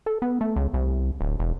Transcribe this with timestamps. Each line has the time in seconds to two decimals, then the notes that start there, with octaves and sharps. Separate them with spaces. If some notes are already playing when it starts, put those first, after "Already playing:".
0.06 A4
0.22 B3
0.41 A3
0.56 C#2
0.74 C2
1.21 D1
1.39 E1